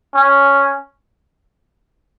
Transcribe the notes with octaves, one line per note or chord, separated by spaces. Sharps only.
C#4